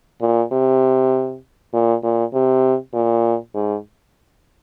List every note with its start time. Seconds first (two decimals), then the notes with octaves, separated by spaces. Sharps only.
0.22 A#2
0.52 C3
1.74 A#2
2.04 A#2
2.34 C3
2.94 A#2
3.55 G#2